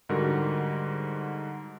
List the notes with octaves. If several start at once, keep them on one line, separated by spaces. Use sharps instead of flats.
G#2 D3 G3 F#4 A#4